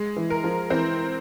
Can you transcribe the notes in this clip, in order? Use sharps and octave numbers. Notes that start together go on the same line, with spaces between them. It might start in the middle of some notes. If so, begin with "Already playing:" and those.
Already playing: G#3
E3
A#4
F3
E3 C4